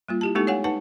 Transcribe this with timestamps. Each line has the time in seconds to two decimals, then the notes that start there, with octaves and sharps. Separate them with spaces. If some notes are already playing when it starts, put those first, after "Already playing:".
0.08 G3 A#3 F4
0.21 E4 G4 A5
0.35 G#3 A3 B3 D#4 G4 A4
0.47 C#5 F5 F#5 G#5
0.64 D#4 B4 F#5 A5